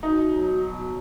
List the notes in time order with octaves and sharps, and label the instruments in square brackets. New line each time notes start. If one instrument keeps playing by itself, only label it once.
[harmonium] B2 [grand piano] D#4
[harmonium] F#3
B2